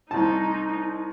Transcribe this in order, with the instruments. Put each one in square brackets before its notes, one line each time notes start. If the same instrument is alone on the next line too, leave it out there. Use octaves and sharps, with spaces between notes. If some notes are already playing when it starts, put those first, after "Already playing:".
[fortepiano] C2 A5 [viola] D#4